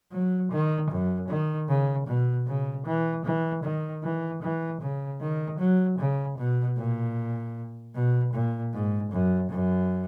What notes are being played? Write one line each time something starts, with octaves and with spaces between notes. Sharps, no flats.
F#3
D#3
F#2
D#3
C#3
B2
C#3
E3
E3
D#3
E3
E3
C#3
D#3
F#3
C#3
B2
A#2
B2
A#2
G#2
F#2
F#2